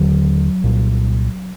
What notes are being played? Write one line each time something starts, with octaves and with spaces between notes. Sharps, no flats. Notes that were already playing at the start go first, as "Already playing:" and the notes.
Already playing: D#2 D3 F#3
C2 A#2